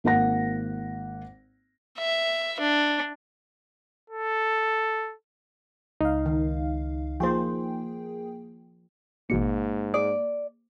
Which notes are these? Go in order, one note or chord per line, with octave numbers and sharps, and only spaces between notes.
G#1 A#3 F#5 A#6
E5
D4
A4
C#2 D#4 F5
D#3
F3 A#3 G#4 C5 G5
A1 G#2 B2 A#3 C#7
G#4 D5